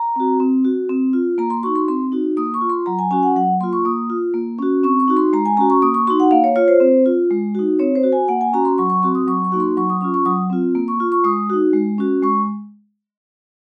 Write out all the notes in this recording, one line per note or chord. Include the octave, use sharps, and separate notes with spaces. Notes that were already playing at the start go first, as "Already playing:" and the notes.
Already playing: A#5
C4 F#4
C4
F#4
C4
F4
A#3 A#5
C6
D#4 F#4 C#6
C6
C4 C6
D#4 F#4
A#3 D#6
C#6
F4
C6
F#3 A#5
G#5
C#4 F#4 G#5
F#5
F#3 F#5
A#3 F4 C6
C#6
A#3 D#6
F4
A#3
C#4 F#4
C4 C#6
C#6
D#4 F#4
C6
G#3 A#5
G#5
C#4 F#4 A#5
C#6
A#3 D#6
C#6
D#4 F#4 C6
F#5
A#3 F5
C#5
F4 C#5
C5
C4
F4
G#3
D#4 F#4
C4 C#5
C5
F#4
G#5
A#3 F#5
G#5
C#4 F#4 A#5
C6
F#3 C#6
C#6
C4 F#4 C6
D#6
F#3 C#6
C#6
A#3 D#4 F#4
C6
F#3 C#6
D#6
C#4 F4 C#6
C#6
F#3 D#6
C4 F4
A#3
C#6
F4
C#6
G#3 D#6
D#4 F#4
G#3
C#4 F#4
G#3 C#6